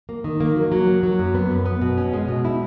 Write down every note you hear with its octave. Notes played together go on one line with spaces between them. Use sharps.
A#3
D#3
A#3
F#3
F#3
A#3
F#3
F#2
B3
F#2
B3
B2
C#4
G#3
B2
E4